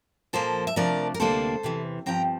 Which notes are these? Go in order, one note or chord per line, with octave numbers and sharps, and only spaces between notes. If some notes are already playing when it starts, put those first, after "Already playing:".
A#2 F3 A#3 A4 C5
E5
C3 F3 A3 D4 A#4 D5
A#4
D2 C3 G3 A#3 D4 A4 C5
E2 C3 E3
G2 F3 C4 G5 A#5